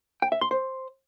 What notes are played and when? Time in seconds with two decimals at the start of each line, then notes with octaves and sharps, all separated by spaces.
0.22 G5
0.32 E5
0.41 C6
0.51 C5